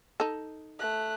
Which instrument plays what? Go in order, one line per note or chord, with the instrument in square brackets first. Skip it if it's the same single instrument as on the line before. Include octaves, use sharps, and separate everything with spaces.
[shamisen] D#4 A4
[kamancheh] A3 F#6